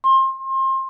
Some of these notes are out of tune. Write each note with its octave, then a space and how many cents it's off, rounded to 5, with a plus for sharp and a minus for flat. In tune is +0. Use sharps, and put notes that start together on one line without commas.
C6 +30